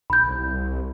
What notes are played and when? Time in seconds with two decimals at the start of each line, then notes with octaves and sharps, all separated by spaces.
0.10 B1 B5 G6
0.26 C2